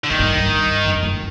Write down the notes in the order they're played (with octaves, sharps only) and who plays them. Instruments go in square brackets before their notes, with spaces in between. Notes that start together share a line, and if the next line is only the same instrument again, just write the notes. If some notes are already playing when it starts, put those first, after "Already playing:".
[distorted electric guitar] D3
[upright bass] G#2 [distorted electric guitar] D#3
[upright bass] G2
F#2
G2
F#2
F2